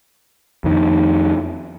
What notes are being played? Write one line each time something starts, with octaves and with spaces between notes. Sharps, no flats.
F2 D#3